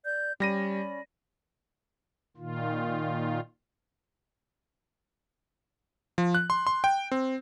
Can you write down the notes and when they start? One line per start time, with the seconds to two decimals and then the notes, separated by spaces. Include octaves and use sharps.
0.04 D5 G6
0.40 G3 C#4 D5 B5 A#6 D#7
2.37 A#2 D#3 F4
6.18 F3
6.35 F#6
6.50 C6
6.67 C6
6.84 G5
7.11 C4